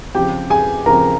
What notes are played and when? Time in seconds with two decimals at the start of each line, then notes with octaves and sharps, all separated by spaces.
0.15 C#3 F3 C4 G4 G5
0.50 G#4 G#5
0.86 C#3 F3 C4 A#4 A#5